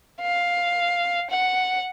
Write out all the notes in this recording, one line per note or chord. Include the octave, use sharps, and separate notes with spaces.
F5
F#5